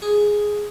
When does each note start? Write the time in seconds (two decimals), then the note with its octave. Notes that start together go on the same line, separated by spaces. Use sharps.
0.02 G#4